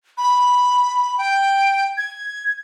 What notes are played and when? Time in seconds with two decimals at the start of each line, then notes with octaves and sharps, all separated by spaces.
0.18 B5
1.18 G5
1.97 G#6